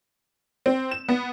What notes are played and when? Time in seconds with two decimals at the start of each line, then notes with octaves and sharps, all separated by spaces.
0.66 C4
0.91 E7
1.09 B3